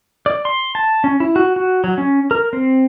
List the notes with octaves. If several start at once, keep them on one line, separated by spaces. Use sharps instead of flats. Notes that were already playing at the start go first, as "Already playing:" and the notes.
D5
C6
A5
C#4
E4
F#4
F#4
F#3
C#4
A#4
C4